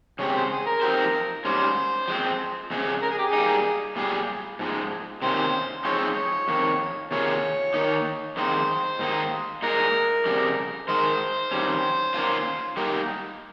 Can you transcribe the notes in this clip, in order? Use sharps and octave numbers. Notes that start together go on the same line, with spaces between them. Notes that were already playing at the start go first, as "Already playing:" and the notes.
C#3 G#3 C4 G4 C#5
C5
G#4
A#4
F3 C4 D#4 G4 C5
G#2 G3 C#4 C5
F3 G#3 C4
F2 C#3 G#3 C#4
A#4
G#4
G4
G#4
G3 A#3 D#4
A#2 G3 G#4
G#2 F3 G#3
C3 D#3 A#3 C#4 C5
F3 G#3 C4 D#4 C#5
C#5
F2 D#3 A#3
C3 D#3 A#3 F4 G#4 C#5
D#3 A#3 D#4
F2 D#3 G#3 C4 D#4 C5
G#2 D#3 A#3 D#4
A#2 G#3 D#4 A#4
F2 C#3 G3
D#3 G#3 D#4 A#4 C5
F2 D#3 G3 C#4
D#3 A#3 C#4 F4
G3 A#3 D#4 A#4